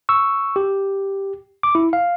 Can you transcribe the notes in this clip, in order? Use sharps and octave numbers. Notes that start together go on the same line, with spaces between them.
C#6 E6
G4
D6
E4
F5